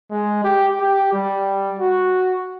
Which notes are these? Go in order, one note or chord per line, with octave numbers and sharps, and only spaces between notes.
G#3
G4
G4
G3
F#4